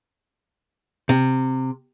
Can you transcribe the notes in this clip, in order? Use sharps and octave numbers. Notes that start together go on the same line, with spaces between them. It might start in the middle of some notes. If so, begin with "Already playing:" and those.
C3